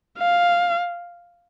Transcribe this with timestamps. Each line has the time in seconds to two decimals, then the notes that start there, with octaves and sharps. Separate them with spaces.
0.18 F5